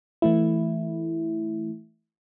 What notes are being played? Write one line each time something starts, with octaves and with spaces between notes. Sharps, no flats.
E3 A3 E4